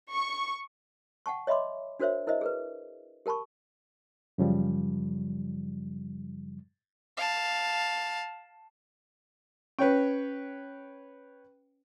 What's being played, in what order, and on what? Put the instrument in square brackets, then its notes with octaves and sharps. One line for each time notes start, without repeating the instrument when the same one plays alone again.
[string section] C#6
[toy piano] F#5 G5 A5 C#6
C#5 D#5 E5 B5 C6 D6
D4 F#4 A#4 C5 C#5 E5
E4 A#4 C5 D#5 E5
G#4 A#4 B4
G4 A#4 A5 B5 C#6
[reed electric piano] F#2 C#3 F3 G3
[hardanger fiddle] F5 A5
[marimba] C#4 [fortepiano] B4 C#5 G5